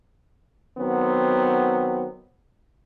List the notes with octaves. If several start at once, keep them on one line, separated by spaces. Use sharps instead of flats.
D#3 F#3 B3 C4